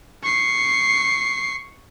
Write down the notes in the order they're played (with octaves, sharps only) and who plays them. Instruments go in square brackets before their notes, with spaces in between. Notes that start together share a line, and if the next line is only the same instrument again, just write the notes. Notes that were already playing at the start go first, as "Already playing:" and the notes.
[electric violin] C#6 C7